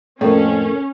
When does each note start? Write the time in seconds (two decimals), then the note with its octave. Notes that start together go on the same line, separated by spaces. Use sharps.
0.21 F2 A2 A3 A#3 C#4